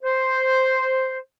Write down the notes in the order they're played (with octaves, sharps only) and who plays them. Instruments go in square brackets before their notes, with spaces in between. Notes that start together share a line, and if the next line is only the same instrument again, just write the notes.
[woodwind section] C5